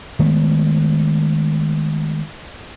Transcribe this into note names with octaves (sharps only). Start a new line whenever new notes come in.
D#3 G#3 A3 B3